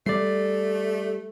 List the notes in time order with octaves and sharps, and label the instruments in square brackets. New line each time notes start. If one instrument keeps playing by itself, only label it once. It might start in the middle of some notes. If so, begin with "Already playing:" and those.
[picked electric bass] G3 [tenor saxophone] A3 [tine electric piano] D5 C7